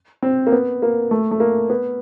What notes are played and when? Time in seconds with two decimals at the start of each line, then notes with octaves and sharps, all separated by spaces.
0.22 C4
0.47 A#3
0.52 B3
0.82 A#3
1.11 A3
1.31 A3
1.40 A#3
1.70 B3